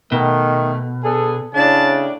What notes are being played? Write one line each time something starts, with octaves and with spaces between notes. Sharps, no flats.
B2 D#3 A3
B3 D4 G#4 A4
A2 C#3 D4 A5